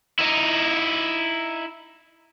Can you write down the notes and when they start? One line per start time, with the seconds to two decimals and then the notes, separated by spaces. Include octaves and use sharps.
0.19 D#4 E4